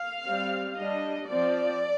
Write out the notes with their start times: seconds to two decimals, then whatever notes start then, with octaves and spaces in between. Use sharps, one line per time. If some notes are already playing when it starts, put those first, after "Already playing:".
Already playing: F5
0.25 G3 C4
0.77 G3 D4 D#5
1.29 F3 C4 D5